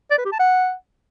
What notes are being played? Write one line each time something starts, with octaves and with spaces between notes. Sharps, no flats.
D5
B4
G4
A5
F#5